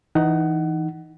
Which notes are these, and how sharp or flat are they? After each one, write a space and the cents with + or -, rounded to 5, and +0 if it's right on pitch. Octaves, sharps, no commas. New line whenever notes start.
E3 -5 D#4 +0 F#5 +20